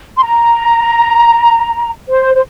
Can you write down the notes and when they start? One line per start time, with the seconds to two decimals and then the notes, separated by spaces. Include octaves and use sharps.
0.18 C6
0.22 A#5
2.09 C5
2.35 C5